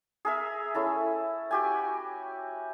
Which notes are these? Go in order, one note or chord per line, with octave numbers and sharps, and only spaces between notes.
G#4 A#4 E5
C#4 E4 A4
F#4 G4 G#5